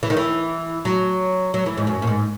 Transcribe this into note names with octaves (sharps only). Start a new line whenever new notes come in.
E3
D#3
E3
F#3
F#3
E3
G#2
F#2
A#2
G#2